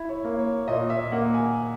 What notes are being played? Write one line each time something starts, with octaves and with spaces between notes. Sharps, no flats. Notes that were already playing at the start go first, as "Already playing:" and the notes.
Already playing: E4
C#5
A#3
C#5
A#2 D#5
E5
A#3 F#5
G#5